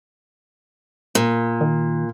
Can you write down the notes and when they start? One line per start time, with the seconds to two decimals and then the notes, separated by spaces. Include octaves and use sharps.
1.15 A#2
1.61 D#3